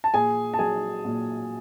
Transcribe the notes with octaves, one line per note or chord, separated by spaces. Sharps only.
A5
A#2 G#4 G#5
A5
F#3 G#4 G#5
A#2